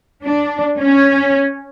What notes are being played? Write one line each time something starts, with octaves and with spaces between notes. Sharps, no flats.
D4
C#4